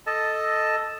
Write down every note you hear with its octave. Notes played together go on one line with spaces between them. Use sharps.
A4 D#5 A5